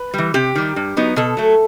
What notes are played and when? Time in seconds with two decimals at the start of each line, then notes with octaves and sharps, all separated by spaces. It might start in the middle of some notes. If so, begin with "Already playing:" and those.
Already playing: B4
0.14 E3 G3
0.34 C3 G4
0.55 D#3 G3
0.76 G2
0.97 F#3 B3 D#4
1.16 B2 A4
1.37 F#3 A3